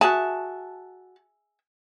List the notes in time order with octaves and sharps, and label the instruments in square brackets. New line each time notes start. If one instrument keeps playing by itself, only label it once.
[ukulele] F#4 A5 [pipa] G#4 E5